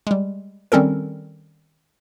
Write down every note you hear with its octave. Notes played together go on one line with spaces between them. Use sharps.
G3 G#3
D#3 G3 C4 C#4 A4 A#4